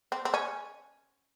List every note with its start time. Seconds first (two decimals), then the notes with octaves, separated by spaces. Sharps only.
0.12 C4
0.25 C4
0.34 C#4